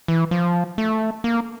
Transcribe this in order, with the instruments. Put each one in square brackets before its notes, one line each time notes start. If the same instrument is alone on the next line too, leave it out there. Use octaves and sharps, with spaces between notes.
[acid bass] E3
F3
A3
A#3